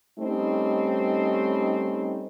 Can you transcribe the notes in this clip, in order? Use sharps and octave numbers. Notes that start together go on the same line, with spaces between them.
G3 A3 C4 C#4 D#4